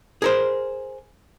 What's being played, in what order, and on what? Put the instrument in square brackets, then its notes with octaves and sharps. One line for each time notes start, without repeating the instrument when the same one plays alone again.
[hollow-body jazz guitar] G#4 A#4 C5